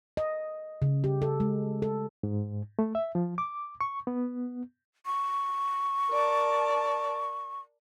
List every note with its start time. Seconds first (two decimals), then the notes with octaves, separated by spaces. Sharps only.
0.17 D#5
0.82 C#3
1.04 G4
1.22 A4
1.40 G#3
1.82 A4
2.23 G#2
2.79 A3
2.95 E5
3.15 F3
3.38 D6
3.81 C#6
4.07 B3
5.06 C#6
6.10 A#4 D5 A5